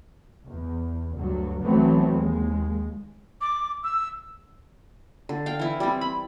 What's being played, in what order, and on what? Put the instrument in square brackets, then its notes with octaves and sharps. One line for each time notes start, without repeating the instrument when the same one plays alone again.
[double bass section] E2
D2 G2 F#3
B1 E3 F#3 A3 B3 C4
D#2 G#3
[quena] D6
E6
[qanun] D3
F5 G5
E3 E4
G3 C4
B5